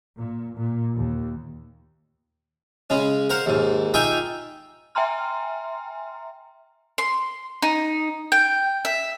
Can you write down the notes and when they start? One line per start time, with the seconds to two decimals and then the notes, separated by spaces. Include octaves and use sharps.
0.19 A#2
0.56 A#2
0.96 D#2
2.90 C#3 G#3 C#4
3.30 A#4 C5 F5 F#5
3.46 D#2 G#2
3.94 D#4 F4 E5 G5 G#5 D6
4.95 E5 G5 G#5 A#5 C6 F6
6.98 C6
7.62 D#4
8.32 G5
8.85 E5